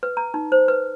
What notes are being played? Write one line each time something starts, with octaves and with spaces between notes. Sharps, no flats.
B4
A#5
D#4
C5
B4